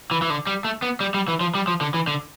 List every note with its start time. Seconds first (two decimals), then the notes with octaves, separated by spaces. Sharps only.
0.11 E3
0.22 E3
0.30 D3
0.47 G3
0.65 A3
0.82 B3
1.01 G3
1.14 G3
1.28 E3
1.41 F3
1.55 G3
1.68 F3
1.81 D3
1.94 E3
2.07 D3